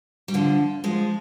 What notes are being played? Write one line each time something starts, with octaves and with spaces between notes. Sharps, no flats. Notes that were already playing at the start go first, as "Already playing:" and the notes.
G3
D3 F3
F3 G#3